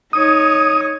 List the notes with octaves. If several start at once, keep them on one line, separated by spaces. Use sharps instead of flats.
D#4 C#5 D#6